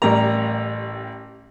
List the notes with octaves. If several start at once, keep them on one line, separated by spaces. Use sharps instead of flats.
A1 G3 A#4 A#5